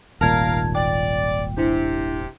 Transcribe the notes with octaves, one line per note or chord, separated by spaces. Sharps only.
D#1 G#1 A#2 A#4 F5 A5 G#6
D5 G5
C3 D4 E4 G4